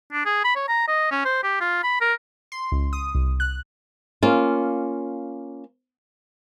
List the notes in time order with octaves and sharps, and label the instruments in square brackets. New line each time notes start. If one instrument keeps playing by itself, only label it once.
[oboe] D4
G#4
B5
C#5
A#5
D#5
C#4
C5
G4
F4
B5
A#4
[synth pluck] C6
C#2
D#6
C2
F#6
[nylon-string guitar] A#3 C#4 F4